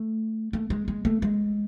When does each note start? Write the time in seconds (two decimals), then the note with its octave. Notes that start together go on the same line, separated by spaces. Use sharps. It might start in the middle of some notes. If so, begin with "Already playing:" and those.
Already playing: A3
0.53 A3
0.70 G#3
0.88 G#3
1.05 A3
1.22 G#3